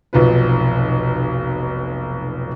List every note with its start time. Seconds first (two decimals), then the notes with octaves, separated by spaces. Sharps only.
0.13 F1 B1 F3 B4